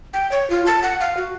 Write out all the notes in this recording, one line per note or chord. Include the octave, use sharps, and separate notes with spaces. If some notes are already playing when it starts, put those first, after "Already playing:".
G5
C#5
F4
A5
F#5
F5
F#4